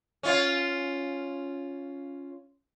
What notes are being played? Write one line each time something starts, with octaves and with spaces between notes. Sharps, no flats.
C#4 F4